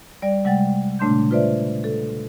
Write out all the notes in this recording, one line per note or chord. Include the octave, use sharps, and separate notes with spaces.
G3 D5
C3 G3 G#3 F#5 G5 A6
A#2 C#3 A3 D4 C6 G6
F4 B4 C5 D5 E5
A4